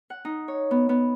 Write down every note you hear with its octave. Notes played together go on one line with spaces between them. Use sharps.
F#5
D#4
C#5
B3
B3